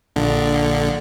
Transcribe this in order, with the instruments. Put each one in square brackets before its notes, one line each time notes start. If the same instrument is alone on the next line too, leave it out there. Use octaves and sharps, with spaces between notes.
[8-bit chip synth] A#1 D3